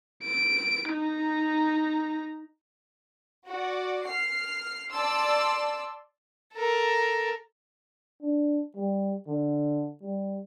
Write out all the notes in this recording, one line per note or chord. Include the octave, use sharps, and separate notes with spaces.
D7
D#4 A#5
F#4 D5
F6 C7
D5 A5 C6 E6
A4 A#4
D4
G3
D3
G3